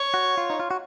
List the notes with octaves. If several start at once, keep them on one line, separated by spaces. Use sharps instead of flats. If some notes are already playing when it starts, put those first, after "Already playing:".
Already playing: C#5
F#4
F4
D#4
F4
F#4